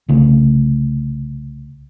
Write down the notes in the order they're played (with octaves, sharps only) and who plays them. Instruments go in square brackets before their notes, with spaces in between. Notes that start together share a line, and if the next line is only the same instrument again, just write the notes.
[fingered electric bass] C2 C#3 A3